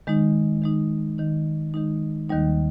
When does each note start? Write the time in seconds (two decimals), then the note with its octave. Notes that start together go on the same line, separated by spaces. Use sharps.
0.07 D#3 G#3 D#4
0.62 D#3 G#3 D#4
1.18 D#3 G#3 D#4
1.74 D#3 G#3 D#4
2.29 D#2 D#3 G3 A#3 D#4